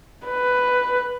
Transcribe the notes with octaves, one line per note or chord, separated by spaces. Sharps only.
B4